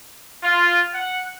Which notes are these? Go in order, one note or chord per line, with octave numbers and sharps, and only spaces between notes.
F4
F#5